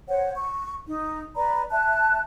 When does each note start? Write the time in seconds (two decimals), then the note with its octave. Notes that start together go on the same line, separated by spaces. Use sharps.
0.09 C5 C#5 F#5
0.35 C#6
0.86 D#4
1.35 B4 D5 A#5 B5
1.70 E5 A5 F#6